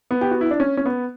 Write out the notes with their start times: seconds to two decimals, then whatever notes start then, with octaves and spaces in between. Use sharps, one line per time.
0.11 B3
0.21 G4
0.31 F#4
0.41 E4
0.51 D4
0.60 C#4
0.77 C#4
0.86 B3